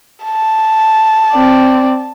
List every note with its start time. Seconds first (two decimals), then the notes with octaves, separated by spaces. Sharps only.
0.24 A5
1.31 C4 D5